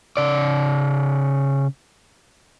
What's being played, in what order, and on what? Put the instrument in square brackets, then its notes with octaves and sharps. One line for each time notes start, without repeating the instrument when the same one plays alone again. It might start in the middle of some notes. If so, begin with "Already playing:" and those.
[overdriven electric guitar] C#3 D5